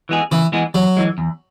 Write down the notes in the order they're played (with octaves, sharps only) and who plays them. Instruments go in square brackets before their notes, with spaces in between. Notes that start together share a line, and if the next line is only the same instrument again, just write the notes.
[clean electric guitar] E3 G#3 B3 G#4
[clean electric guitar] C#3 [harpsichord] E3
[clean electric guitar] E3 G#3 B3 G#4
[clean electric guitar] E2 [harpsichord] F#3
[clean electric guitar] E3 G#3
E2